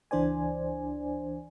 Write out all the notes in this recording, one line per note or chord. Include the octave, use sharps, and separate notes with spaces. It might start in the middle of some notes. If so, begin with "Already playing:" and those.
C#2 E3 D4 C5 D5 G#5